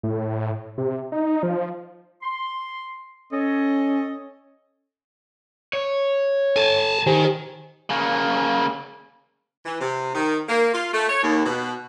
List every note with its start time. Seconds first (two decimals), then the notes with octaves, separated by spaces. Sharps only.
0.03 A2
0.78 C3
1.12 D#4
1.43 F3
2.22 C6
3.32 C#4 A4 C#5 D#5
5.73 C#5
6.56 A4 G#5 A5
7.07 D#3 G4 C5 G#5
7.90 C#3 A#3
9.65 E3
9.81 C3
10.14 D#3
10.48 A#3
10.74 F4
10.93 A3
11.09 C#5
11.22 D#2
11.46 B2